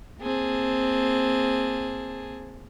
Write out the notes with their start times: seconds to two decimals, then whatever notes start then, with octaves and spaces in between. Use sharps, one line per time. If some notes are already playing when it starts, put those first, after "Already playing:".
0.20 A#3 C4 G#4 A5